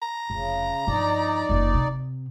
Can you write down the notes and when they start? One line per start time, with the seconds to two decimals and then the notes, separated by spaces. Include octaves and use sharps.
0.02 A#5
0.30 F1 C#3
0.87 G2 F3 D#4 D5
1.49 F#1 F2
1.74 C3